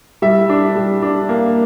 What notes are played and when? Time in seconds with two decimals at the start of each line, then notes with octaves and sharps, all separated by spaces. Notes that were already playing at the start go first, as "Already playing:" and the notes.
0.22 G3 E5
0.49 D4
0.75 G3
1.03 D4
1.29 A#3